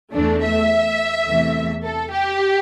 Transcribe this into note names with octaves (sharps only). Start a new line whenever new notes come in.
E2 E3 A3 D4
E5
E2 C3 E3 A3
A4
G4